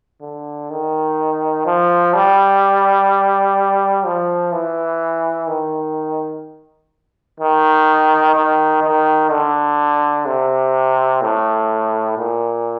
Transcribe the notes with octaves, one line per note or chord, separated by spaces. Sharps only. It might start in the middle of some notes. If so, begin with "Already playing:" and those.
D3
D#3
F3
G3
F3
E3
D#3
D#3
D#3
D#3
D3
C3
A2
A#2